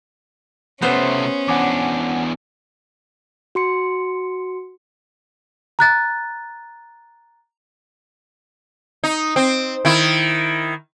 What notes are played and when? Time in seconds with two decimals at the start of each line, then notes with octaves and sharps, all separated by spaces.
0.82 C3 A3 B3 C#4 C5 E5
1.48 E2 D4 F#5 G#5 D6
3.55 F#4 C6 C#7
5.79 A#5 F#6 A6
9.04 D#4
9.36 C4
9.85 D#3 E4